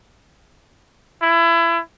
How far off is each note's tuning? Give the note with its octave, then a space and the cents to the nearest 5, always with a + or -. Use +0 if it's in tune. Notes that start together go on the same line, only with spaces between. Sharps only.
E4 +25